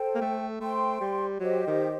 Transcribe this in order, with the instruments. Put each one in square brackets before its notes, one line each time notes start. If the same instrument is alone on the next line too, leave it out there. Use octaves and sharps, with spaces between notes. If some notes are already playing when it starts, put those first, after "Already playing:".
Already playing: [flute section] A4 C5 G5
[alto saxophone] A#3
A3
[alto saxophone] A3 [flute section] C5 G5 C6
[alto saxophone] G3
[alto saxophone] F#3 [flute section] G4 C5 D#5
[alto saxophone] D#3